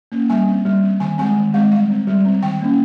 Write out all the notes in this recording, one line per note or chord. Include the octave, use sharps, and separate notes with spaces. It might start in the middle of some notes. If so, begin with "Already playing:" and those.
A#3 C#4
G3 G#5
C4
G3
C4
D#3 G#5
G#3 C4 G#5
D#3
G#3 C4 F5
G3 F5
C4
G3
C4
D#3 G5
A#3 C#4